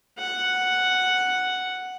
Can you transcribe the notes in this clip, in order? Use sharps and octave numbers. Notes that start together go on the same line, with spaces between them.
F#5